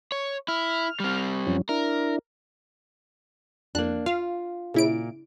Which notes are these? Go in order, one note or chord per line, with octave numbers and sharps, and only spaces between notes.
C#5
E4 F6
G3 C4
F#2 F3 C#4
D4 E4 A#4
F2 A#3 D4 F#6
F4 F5
A#2 C#3 E4 D7